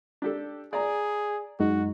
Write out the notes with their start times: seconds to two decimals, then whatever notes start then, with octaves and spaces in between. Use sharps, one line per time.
0.22 D4 G4 A4
0.73 G#4 D5 A#5
1.60 F#2 G#3 D#4 F#4